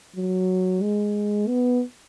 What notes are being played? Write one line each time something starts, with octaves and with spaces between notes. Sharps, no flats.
F#3
G#3
B3